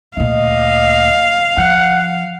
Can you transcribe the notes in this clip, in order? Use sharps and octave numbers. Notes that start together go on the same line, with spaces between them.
D2 A#2 D#5 F5
F3 F#5